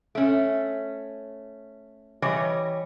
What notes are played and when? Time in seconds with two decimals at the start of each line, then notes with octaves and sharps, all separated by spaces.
0.15 A3 C#4
2.22 E3 G3 C#5 D#5